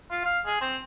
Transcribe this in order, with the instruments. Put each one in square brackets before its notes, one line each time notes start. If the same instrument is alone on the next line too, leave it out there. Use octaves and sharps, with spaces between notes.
[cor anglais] F4
F5
G#4
C4